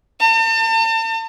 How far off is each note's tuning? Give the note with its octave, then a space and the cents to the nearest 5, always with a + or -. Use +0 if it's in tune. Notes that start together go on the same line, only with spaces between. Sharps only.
A5 +40